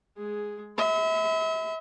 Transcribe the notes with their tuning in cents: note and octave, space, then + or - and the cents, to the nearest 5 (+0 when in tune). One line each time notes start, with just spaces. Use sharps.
G#3 +10 G#4 +0
E5 -35 B5 +35